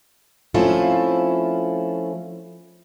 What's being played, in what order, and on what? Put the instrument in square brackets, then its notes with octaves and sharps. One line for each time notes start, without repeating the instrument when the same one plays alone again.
[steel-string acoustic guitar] F3 A3 C4 C#4 E4 F4